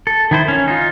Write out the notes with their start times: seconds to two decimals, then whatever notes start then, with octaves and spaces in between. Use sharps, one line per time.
0.07 A4
0.31 D#3 E4 C5
0.48 C#4
0.68 D#4 F4